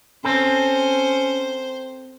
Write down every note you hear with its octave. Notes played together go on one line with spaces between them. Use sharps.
C4 C#4 A4 C5